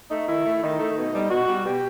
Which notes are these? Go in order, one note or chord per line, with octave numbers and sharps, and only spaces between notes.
A3 D#4
D#3 E4
A3
D#3 D#4
A3
B2
G3
B2 F#4
G3
B2 G4